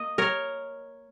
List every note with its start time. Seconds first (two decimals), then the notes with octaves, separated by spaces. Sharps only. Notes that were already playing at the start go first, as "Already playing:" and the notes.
Already playing: A#3 D#5
0.18 A#4 C#5